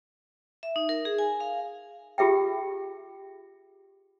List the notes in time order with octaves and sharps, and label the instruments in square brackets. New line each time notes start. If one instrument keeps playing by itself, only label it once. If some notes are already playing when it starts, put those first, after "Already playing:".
[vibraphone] E5
D#4
A#4
G#4
G#5
F5
[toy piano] F4 G4 G#4 E5 G5